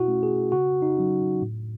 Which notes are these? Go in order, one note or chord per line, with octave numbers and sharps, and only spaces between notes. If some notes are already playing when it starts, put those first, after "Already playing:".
Already playing: B2 E4 F#4
A3 C#4
G#4
C#3 F#4
D#4
F#3 C#4
A2